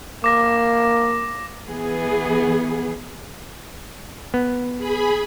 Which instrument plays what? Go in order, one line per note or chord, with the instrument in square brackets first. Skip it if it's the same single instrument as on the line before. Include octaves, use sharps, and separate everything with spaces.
[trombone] A#3 [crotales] D6 A#6
[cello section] E3 B3 G#4
[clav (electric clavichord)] B3
[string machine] G#4 B5